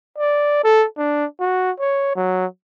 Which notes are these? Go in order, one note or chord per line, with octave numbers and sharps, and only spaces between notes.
D5
A4
D4
F#4
C#5
F#3